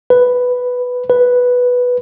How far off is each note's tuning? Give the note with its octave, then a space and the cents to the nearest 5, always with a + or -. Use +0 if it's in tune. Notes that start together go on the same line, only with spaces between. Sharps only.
B4 +5
B4 +0